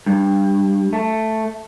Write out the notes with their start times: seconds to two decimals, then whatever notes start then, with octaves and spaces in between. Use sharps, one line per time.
0.06 G2
0.93 A3